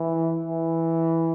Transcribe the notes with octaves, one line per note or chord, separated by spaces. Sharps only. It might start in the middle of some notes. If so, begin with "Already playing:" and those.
Already playing: E3
E3